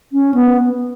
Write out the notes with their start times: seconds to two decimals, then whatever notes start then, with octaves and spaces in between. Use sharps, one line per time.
0.13 C#4
0.34 B3